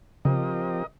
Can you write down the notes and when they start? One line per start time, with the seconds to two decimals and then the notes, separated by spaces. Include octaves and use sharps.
0.25 C#3 F3 C4 G4 A#4 D#5